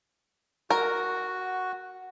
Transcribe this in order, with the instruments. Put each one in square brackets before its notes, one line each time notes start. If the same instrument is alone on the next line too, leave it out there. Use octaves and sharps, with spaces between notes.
[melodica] F#4 [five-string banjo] A#4